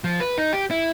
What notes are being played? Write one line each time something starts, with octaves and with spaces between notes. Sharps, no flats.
F3
B4
D#4
G4
E4